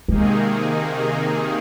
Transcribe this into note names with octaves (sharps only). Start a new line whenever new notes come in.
C3 D#3 G#3 A#3 D#4 G#4